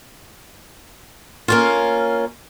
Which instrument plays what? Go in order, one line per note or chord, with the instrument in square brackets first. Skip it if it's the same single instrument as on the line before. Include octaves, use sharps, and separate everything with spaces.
[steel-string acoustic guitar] A#3 C#4 F4